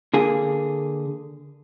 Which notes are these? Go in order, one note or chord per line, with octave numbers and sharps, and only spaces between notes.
D3 A#3 G#4